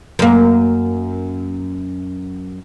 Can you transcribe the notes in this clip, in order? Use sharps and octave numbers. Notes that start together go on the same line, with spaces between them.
F#2 A#3